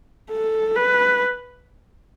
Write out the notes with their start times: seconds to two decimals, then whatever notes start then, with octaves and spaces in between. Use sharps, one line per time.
0.31 A4
0.76 B4